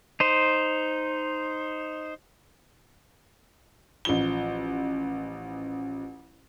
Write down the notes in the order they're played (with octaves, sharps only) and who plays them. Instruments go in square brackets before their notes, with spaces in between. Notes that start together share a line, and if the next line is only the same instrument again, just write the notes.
[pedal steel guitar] D#4 C5
[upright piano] A1 F3 G7